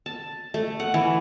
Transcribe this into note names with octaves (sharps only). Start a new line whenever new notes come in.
A5
A3
F#5
E3